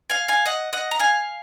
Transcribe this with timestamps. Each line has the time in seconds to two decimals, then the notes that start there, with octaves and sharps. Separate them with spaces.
0.10 F5 G#5
0.28 F5 G#5
0.46 D#5 F#5
0.73 D#5 F#5
0.91 A#5
0.99 F5 G#5